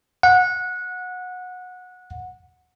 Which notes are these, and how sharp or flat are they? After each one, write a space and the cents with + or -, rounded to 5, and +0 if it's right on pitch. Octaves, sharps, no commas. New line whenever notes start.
F#5 -20